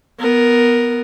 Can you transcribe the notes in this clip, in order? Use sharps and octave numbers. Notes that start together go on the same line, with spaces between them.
B3 A#4